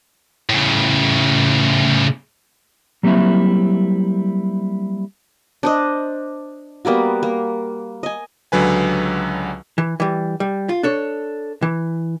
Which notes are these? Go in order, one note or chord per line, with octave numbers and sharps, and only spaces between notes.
A2 C#3
F#3 G3 A#3 C4 E4 E5
D4 C5 D#5
G3 A#3 B3 F#4
A#3
D#5 G#5
C#2 D3 F#3 B4 G#5
E3
E3 G3
G3
F4
D4 A4 C#5
E3